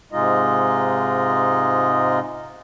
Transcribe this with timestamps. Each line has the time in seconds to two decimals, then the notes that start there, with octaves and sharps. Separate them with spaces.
0.12 G#2 C3 G#3 D#4 F4 D#5